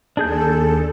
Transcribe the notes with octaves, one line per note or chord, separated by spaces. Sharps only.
D#2 D4 G#4 A4 G6